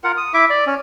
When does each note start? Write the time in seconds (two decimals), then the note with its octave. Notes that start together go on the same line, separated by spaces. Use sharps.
0.04 F4 A#4 F#5
0.17 D#6
0.34 E4 E5 D6
0.50 D5
0.67 C#4